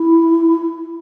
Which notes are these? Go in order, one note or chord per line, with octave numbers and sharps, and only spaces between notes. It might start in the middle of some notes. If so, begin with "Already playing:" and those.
Already playing: E4